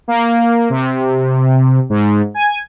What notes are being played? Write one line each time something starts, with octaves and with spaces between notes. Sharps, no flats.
A#3
C3
G#2
G#5